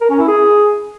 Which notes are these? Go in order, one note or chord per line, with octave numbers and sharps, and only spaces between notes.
A#4
C#4
E4
G#4